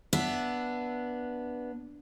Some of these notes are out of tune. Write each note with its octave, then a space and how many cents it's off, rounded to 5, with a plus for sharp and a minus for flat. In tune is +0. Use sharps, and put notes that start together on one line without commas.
B3 -10 D4 +0 E5 +0